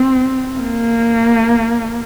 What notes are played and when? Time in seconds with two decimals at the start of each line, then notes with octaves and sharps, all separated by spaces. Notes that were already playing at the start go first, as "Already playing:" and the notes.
Already playing: C4
0.60 A#3